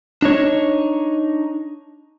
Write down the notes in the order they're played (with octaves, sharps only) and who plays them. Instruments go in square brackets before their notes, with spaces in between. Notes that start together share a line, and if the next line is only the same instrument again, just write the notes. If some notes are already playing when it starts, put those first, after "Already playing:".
[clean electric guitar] D4 D#4 C#5